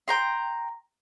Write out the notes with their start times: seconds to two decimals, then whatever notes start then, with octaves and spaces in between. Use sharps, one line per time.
0.08 G5 A#5 C6